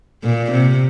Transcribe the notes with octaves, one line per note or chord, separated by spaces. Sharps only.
A#2
C3